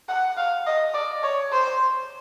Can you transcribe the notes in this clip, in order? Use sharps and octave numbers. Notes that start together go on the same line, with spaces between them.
F#5
F5
D#5
D5
C#5
C5